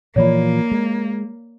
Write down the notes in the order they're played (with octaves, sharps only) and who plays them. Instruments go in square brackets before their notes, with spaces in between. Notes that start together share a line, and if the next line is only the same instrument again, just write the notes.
[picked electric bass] A#2 E3 F3 [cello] A#3 [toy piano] C#5 D5 B5
[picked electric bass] G#3